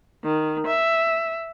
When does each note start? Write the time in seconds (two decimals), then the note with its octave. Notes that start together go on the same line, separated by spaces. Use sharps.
0.24 D#3
0.67 E5